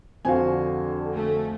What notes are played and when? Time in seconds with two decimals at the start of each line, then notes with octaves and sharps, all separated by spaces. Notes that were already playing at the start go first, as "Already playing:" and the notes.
0.25 F2 D3 F#4 C5 F5 G#5
1.15 A3